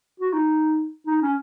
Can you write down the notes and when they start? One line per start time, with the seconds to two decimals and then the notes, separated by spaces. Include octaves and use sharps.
0.20 F#4
0.33 D#4
1.07 D#4
1.22 C#4